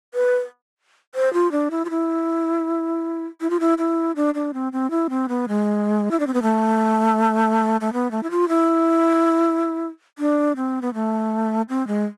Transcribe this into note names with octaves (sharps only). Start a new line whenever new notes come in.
B4
C5
F4
D4
E4
F4
E4
E4
F4
E4
E4
D4
D4
C4
C4
E4
C4
B3
G#3
E4
D4
C4
B3
A3
A3
B3
A3
E4
F4
E4
D4
C4
B3
A3
C4
G#3